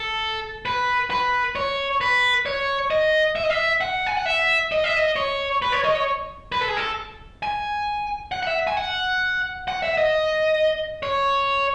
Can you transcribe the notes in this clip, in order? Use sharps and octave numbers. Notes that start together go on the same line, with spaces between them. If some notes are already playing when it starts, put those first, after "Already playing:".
Already playing: A4
B4
B4
C#5
B4
C#5
D#5
E5
D#5
E5
F#5
G#5
F#5
E5
D#5
E5
D#5
C#5
B4
C#5
D#5
C#5
B4
A4
G#4
A4
G#5
F#5
F#5
E5
G#5
F#5
F#5
E5
D#5
C#5